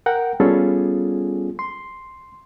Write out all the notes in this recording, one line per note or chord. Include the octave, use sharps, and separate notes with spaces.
A#4 F#5 G5
G3 B3 C#4 F4 G#4 A4
C6